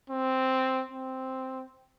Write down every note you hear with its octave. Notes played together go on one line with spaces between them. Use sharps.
C4
C4